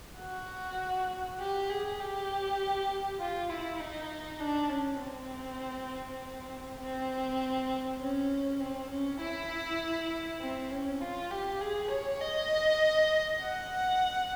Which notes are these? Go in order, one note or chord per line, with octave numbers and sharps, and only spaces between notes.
F#4
G4
G#4
G4
F4
E4
D#4
D4
C#4
C4
C4
C#4
C4
C#4
E4
C4
C#4
F4
G4
G#4
C#5
D#5
F#5